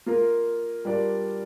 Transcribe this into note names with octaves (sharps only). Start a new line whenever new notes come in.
A#3 F4 A#4
G3 D4 F4 A#4 D5